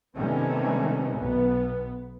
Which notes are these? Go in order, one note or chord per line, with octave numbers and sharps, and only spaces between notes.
C3 D#3 G3 A3 B3 C#4
B1 B3